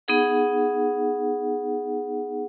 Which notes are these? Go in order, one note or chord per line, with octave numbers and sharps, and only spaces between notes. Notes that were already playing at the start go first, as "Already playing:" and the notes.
B3 D#4 G#4 F#5